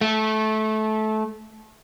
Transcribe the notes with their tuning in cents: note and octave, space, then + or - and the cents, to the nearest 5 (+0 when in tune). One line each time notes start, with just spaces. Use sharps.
A3 -20